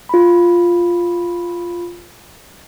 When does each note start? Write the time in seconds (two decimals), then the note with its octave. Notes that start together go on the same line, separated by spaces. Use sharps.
0.09 F4 B5